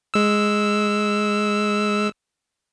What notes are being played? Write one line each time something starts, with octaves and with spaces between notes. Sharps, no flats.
G#3 E6